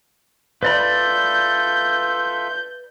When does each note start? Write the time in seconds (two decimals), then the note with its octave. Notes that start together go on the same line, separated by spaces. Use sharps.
0.63 F4 A4 B4 D5 E5 B5 G6